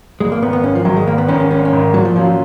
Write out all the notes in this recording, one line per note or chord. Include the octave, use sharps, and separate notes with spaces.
G#1 G#3
A#3
G#2 D#3 B3
B3
G#1 C#4
F3
G#2 D#3 F#3
G#3
G#1 A#3
B3
G#2 D#3 C#4
C#4
G#1 C#4
C#4
G#2 D#3
A#2 F#3
F3
F3 F#3 C#4 F4